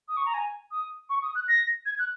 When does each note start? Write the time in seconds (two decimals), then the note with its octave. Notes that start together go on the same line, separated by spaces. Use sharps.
0.08 D#6
0.17 C#6
0.25 A#5
0.34 G#5
0.71 D#6
1.09 C#6
1.22 D#6
1.35 F#6
1.48 A#6
1.86 G#6
1.99 F#6